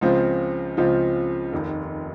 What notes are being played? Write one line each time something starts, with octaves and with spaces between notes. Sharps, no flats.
C#2 C#3 F3 C4 F4
C#2 C#3 F3 C4 F4
F1 D#2 D#3